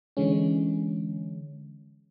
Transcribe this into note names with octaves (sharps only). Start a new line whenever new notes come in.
D3 E3 G#3 C#4